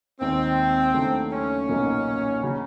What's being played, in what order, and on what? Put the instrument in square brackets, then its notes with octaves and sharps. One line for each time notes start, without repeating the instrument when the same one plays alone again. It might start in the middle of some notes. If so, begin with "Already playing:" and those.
[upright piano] D#2 D#3 G#3 [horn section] C4
[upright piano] D#2 C#3 F#3 A3 D4
[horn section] C#4
[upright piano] B1 A#2 F#3 A#3 D#4
C#3 F#3